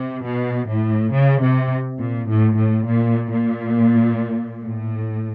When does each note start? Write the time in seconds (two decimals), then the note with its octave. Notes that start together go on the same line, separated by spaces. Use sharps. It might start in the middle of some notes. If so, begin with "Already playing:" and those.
Already playing: C3
0.24 B2
0.68 A2
1.12 C#3
1.41 C3
1.99 A#2
2.28 A2
2.57 A2
2.87 A#2
3.30 A#2
4.62 A2